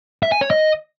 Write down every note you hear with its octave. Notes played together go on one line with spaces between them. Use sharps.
E5
G#5
C#5
D#5